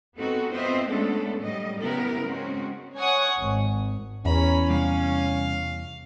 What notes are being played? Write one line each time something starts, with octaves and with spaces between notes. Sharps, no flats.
B3 C4 D#4 F#4 A4
B3 C4 F4 C5 D#5 E5
G#3 A3 B3 C#4 D4 A4
A2 F#3 G3 D#5
C#3 B3 E4 G4 A#4
G#3 C4 C#4 F#4
C#5 F#5 G#5 C#6 D#6
G#1
E2 C#4 A#5 B5
C3 G3 F5